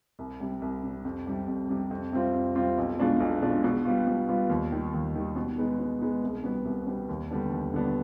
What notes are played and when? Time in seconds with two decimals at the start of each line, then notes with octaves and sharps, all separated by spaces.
0.19 C2
0.40 C3 G3
0.62 C2
0.83 C3 G3
1.05 F2
1.27 C3 G3
1.48 F2
1.69 C3 G3
1.91 F2
2.12 C3 G3 C4 F4
2.34 F2
2.55 C3 G3 C4 F4
2.78 B1
2.99 B2 G#3 D4 F4
3.20 B1
3.42 B2 G#3 D4 F4
3.64 B2
3.85 G3 B3 F4
4.07 B2
4.29 G3 B3 F4
4.50 D#2
4.72 D#3 G3
4.94 D#2
5.15 D#3 G3
5.36 B2
5.58 G#3 B3 D#4
5.79 B2
6.01 G#3 B3 D#4
6.23 C2
6.44 B2 G3 B3
6.65 C2
6.87 B2 G3 B3
7.09 D#2
7.31 D3 G3 B3 D4
7.52 D#2
7.73 D3 G3 B3 D4